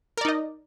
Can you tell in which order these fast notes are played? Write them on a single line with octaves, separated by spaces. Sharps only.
A#4 D5 D#4 D#5